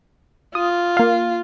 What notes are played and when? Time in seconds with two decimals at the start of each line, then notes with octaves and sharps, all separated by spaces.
0.55 F4 D#6
0.97 A#3 F5